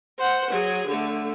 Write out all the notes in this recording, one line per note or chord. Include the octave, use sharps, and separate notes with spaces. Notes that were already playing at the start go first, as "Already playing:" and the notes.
C5 F#5
F#3 G#4
D3 A3